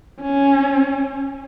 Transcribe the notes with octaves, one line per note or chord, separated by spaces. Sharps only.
C#4